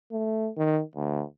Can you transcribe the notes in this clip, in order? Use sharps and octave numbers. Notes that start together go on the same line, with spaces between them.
A3
D#3
D2